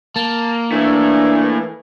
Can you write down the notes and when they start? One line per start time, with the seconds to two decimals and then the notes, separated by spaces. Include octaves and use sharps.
0.16 A#3 A5
0.72 E3 A3 D4 E4